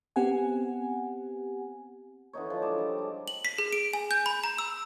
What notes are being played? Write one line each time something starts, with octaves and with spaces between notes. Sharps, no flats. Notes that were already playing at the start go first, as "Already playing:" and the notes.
B3 C4 G4 F#5 G#5
D3 E3 D#4 C#5
F3
G#3 D5 A5 A#5
G3
D#4
F#7
B6
G#4
D7
G#5
G6
B5
A#5
E6